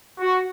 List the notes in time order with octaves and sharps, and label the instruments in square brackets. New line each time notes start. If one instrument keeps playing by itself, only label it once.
[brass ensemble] F#4